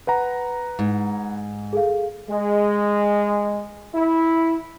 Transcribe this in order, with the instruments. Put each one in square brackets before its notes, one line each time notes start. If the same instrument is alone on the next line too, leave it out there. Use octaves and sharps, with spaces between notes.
[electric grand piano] B4 F#5 A#5
[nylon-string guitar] G#2
[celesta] G#4 A4 F5
[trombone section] G#3
E4